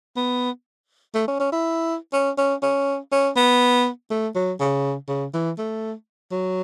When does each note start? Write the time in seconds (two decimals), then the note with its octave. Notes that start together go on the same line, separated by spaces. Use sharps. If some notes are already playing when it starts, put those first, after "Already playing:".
0.16 B3
1.14 A3
1.28 C#4
1.40 C#4
1.52 E4
2.13 C#4
2.38 C#4
2.62 C#4
3.12 C#4
3.36 B3
4.10 A3
4.35 F#3
4.60 C#3
5.08 C#3
5.33 E3
5.58 A3
6.31 F#3